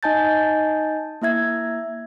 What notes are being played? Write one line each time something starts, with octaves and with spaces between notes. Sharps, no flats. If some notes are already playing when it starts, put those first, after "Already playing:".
D#4 D#5 G#5 A5 G6 A6
A#3 E4 E5 G#6